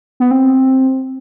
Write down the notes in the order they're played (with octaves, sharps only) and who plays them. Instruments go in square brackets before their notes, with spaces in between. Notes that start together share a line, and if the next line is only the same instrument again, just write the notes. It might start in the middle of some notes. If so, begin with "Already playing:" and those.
[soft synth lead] B3
C4